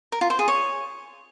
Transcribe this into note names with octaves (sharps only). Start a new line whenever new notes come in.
A#4
F4
C5
G#4
C#5